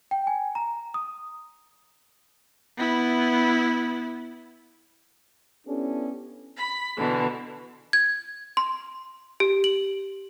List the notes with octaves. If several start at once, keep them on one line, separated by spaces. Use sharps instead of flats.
G5
G#5
A#5
D#6
B3 E4
B3 C#4 D4 E4 G4 A4
B5
B2 D3 E3
G#6
C6
G4
F#7